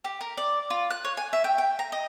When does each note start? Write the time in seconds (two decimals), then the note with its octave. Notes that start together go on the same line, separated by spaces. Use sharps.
0.04 G4
0.21 A#4
0.37 D5
0.70 F4
0.90 F#6
1.05 C#5
1.17 G#5
1.33 E5
1.44 G5
1.58 G5
1.79 A#5
1.92 D#5